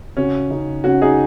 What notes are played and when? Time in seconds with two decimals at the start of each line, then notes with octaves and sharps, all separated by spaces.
0.17 C#3 C#4 F#4
0.50 C#3 D#4
0.84 C#3 C#4 F#4
1.02 D#4 G#4